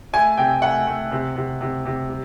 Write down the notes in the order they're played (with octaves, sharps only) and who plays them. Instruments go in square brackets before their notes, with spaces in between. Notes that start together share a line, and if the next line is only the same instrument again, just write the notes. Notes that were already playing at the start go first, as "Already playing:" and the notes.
[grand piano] A3 G#5
C3 G5
A3 F#5
A3
C3
C3
C3
C3
G3